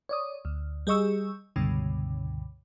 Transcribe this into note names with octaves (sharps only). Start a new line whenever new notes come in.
C#5 D5 D#6
D2
G3 G#4 D#5 C#6 E6
C#2 G2 B2 D3